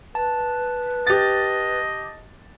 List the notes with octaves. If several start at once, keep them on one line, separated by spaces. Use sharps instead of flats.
B4 A5
G4 D#5 A6